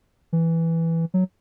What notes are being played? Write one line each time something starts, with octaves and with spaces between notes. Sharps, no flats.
E3
F#3